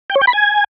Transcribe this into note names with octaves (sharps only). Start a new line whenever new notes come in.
G5
C#5
G5
B5
G#5